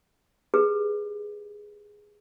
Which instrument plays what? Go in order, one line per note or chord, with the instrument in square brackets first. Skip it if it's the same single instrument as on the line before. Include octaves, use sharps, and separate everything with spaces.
[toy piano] G4 G#4 B4